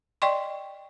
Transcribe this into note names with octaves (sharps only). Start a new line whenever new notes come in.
D5 D#5 G5 C6 C#6